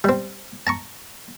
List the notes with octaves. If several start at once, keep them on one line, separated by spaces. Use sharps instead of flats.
G3 C4
A5 A#5 C#6